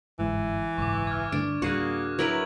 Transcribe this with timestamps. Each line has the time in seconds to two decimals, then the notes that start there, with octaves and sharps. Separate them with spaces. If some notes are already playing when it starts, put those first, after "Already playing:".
0.19 G1 G#2 E3 G#3
0.78 F#1 B1 G#2 C#6 D6
1.07 F6 G#6
1.32 G2 D3 A3 D4
1.62 D1 G3 A#3 F#4 G#4 C#6 F#6
2.19 F#3 E4 A#4 B4 G#6 F7 F#7